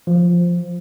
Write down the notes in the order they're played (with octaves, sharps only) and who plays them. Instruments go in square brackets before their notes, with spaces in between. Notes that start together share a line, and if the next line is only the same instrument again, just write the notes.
[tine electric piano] F3